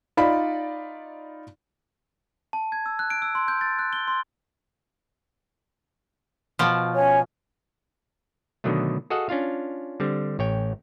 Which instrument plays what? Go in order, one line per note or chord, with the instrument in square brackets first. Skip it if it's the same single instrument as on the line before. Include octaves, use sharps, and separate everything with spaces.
[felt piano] D#4 F4 D5 B5
[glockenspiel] A5
G#6
E6
F#6
D7
E6
C6
G6
A6
F#6
G7
C6
[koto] B2 F3
[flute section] C#4 C#5 G#5
[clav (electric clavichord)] B2 D3 D#3 F#3 A3
F#4 G#4 A4 D#5 F5 F#5
C#4 D4 F4 F5
D3 G3 C4
A1 C#5 G5